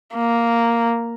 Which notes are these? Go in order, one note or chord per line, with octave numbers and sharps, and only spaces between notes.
A#3